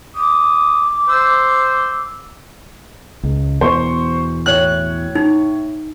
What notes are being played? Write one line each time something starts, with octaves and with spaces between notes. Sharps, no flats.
D6 D#6
C5 E6
C#2
E2 B2 C5 C#6
A2 C#5 F#6
D#4